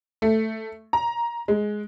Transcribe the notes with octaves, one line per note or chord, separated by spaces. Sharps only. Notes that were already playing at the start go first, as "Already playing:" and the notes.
A3
A#5
G#3